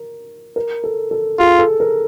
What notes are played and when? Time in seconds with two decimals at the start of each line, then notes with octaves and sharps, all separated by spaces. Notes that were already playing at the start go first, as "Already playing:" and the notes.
Already playing: A#4
0.56 A#4
0.84 A4
1.11 A4
1.39 F4 G#4
1.59 A4
1.80 A#4